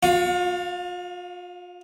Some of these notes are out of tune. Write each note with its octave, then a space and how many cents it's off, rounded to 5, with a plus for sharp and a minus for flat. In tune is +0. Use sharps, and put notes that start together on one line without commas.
F4 +40 F5 +0 C#6 +15